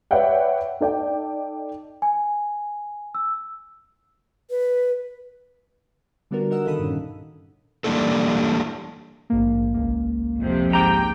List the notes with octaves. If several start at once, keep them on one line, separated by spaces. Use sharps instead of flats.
B4 C#5 D5 E5 F#5 G5
D#4 A4 D5 G5
G#5
E6
B4
D3 G3 B3 D4 F#4 A#4
D#4 A#4 D#5 F#5 E6
C2 D#3 A4 F5 B5 D#6
G2 A#2 C#4
E3 G3 A#3 D4 D#4 A4
A#1 G#2 A#3
G#1 C#2 A#3
F2 C3
G#2 G4 G5 A#5